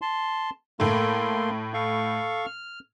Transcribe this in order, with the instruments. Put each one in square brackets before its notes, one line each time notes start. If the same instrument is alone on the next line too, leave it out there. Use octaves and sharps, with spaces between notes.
[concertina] A5 C6
[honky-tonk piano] A2 A3 [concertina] A#3 A4 C6
[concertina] A4 F5 C#6
F6